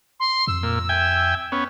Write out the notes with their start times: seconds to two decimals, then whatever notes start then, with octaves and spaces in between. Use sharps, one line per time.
0.20 C6
0.47 F2 E6
0.63 A#2
0.89 E5 G5 G#5
1.52 B3 C#4